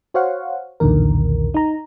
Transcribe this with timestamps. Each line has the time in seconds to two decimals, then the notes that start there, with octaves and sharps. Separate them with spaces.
0.14 F#4 C5 C#5 F5 F#5
0.80 B1 E2 A#2 D3 D#3 A#4
1.54 D#4 A#5